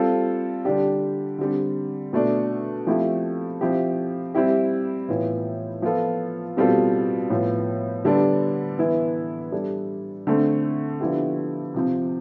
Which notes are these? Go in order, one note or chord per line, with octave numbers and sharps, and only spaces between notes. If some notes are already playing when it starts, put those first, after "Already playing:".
Already playing: G3 C4 F4 A4
D3 G3 D4 G4
D3 G3 C4
B2 A3 D4
F3 A3 C4 E4 G4
F3 C4 E4 G4
G3 C4 E4 G4
A2 E3 B3 F4
F3 B3 F4 A4
B2 G3 C4 F4 A4
A2 F3 B3 F4
D3 G3 B3 D4 A4
E3 B3 E4
G3 D4 A4
D3 A3 C4
D3 F3 B3 E4 G4
C3 F3 C4